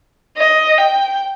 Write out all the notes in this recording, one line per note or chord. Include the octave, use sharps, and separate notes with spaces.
D#5
G5